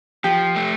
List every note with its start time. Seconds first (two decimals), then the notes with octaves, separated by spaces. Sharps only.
0.24 F3 G4
0.56 A3